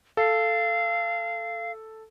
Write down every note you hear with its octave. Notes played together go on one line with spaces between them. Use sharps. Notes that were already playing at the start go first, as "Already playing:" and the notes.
A4 F5